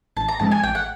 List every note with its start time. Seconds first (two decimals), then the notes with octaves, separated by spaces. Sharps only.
0.17 A1 A5
0.28 A#5
0.39 G#2 F3 G#3 C4 A5
0.51 G#5
0.63 A1 G5
0.75 F#5